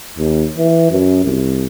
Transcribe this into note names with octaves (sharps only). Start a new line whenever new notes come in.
D#2
E3
F#2
C2